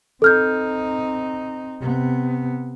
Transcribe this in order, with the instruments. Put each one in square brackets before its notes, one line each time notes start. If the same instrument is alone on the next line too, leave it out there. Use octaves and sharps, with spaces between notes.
[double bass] C4 D#4 [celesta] A4 F6 G6
[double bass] C3 B3